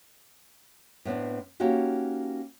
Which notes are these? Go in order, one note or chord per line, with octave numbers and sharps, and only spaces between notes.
A2 B3 C4 D4
A#3 C#4 D#4 F#4 G4